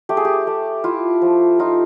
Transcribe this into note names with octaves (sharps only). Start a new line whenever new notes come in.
A3 G4
G#4
G4
A3
E4 F4
F3
D#4 F4